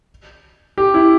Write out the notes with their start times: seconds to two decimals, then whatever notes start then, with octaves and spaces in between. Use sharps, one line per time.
0.78 G4
0.94 E4